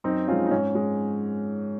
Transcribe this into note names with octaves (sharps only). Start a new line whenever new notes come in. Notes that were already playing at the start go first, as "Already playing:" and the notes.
F#2 C4 D#4
F3 G#3 C#4 F4
D#4
G#2 C#4
G#3